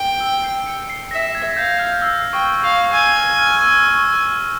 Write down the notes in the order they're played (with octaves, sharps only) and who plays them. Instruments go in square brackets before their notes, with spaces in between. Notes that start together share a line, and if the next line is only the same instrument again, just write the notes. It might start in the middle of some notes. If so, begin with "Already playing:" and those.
Already playing: [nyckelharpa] G5
[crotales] E6
C7
C#7
C7
[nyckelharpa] E5 [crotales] A#6
[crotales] G#6
[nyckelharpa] F5 [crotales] G6
[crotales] F6
E6
[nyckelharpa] G5 [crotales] C#6
[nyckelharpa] F5 [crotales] C#6
[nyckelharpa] G#5 [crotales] E6
[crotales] F6
F6
E6
C#6